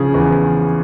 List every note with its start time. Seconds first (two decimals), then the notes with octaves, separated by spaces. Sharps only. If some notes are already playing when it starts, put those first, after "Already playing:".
Already playing: C#3 F3 G#4
0.14 E2